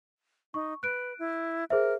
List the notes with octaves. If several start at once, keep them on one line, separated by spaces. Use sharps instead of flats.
D#4 C#6
B4 F#6 D7
E4
G#4 A#4 C5 E5